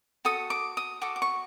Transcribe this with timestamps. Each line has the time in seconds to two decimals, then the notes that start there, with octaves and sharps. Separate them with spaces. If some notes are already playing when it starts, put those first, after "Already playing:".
0.25 F#4 A4 D#6
0.50 D6
0.77 D#6
1.01 F#4 A4 D6
1.16 D6
1.22 C#6